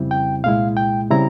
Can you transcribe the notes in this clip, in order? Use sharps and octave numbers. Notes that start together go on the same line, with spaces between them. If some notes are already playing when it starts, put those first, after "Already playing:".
Already playing: F2 C#3 G3 C4 E4
G5
C2 A#2 G#3 E4 F5
G5
C#3 G3 C4 E4 A#5